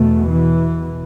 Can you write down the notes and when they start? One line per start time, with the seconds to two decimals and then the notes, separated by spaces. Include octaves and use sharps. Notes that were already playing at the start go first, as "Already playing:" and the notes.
Already playing: E2 B2 A3
0.28 E3